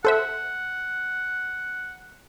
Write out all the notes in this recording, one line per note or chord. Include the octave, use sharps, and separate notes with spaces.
A4 C5 E5 F#5